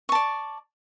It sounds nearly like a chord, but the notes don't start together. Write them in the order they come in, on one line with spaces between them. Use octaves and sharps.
C#6 A5 D5